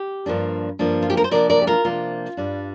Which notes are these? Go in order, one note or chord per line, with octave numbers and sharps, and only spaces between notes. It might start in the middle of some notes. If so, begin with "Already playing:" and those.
Already playing: G4
G2 F3 A#3 D4
G2 F3 A#3 D4
F4
G4
A#4
C5
C3 F3 A#3 D4 A#4 D5
A#4 D5
G4
F4 A#4
C3 F3 A#3 D4 F4
G2 G3 D4